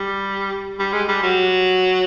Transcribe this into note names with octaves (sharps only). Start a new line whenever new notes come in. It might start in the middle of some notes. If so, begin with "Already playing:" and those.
Already playing: G3
G3
G#3
G3
F#3